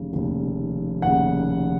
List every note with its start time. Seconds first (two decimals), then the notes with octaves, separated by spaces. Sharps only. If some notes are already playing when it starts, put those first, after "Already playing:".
Already playing: F1 D#2 C#3
0.13 F1 D#2 C#3
1.02 F1 D#2 C#3 F#5